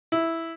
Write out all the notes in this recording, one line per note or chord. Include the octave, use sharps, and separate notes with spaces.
E4